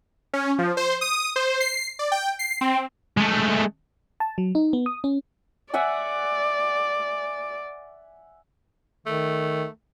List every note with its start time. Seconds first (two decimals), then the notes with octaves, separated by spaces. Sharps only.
0.33 C#4
0.58 F3
0.77 C5
1.01 D#6
1.36 C5
1.60 C7
1.99 D5
2.12 G5
2.39 C7
2.61 C4
3.17 G#3 A3
4.20 A5
4.38 F#3
4.55 D#4
4.73 B3
4.86 D#6
5.04 C#4
5.74 D5 E5 F#5 G#5
9.06 D#3 A3